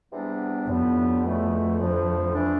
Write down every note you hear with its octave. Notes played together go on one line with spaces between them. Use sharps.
E2 C3 G3 B3 D4
F2 A2 G3 B3 D4
E2 B2 A3 E4
D2 D3 F3
E3 A3 D4